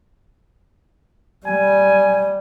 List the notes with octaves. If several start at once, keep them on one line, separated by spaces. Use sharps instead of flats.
G3 G#5